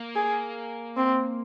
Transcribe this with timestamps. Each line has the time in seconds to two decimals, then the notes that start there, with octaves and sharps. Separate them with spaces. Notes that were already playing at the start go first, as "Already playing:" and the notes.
Already playing: A#3
0.16 G#4
0.97 C4